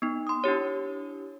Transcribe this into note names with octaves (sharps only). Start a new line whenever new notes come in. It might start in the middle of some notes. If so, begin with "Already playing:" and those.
B3 D#4
C6 D#6
D4 E4 G4 C#5